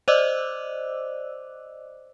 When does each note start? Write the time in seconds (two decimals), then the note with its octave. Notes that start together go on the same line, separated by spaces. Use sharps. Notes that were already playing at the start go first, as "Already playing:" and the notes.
0.08 C5 D5 D#5 D6 E6 F#6